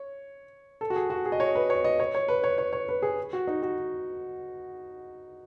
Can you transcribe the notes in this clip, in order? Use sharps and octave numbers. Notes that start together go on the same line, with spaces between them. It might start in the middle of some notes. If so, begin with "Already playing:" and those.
Already playing: C#5
A4
F#4
G#4
F#4
G#4
D#5
C#5
B4
C#5
D#5
C#5
C#5
B4
C#5
C#5
C#5
B4
G#4
F#4
D#4
F#4